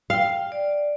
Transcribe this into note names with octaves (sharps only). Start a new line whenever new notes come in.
F5 G5
D5